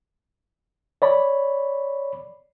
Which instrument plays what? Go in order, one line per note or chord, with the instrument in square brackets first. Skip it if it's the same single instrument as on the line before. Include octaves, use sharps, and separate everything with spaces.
[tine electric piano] C#5 D5 B5